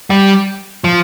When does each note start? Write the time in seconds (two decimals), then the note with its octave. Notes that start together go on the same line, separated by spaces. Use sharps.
0.10 G3
0.84 F3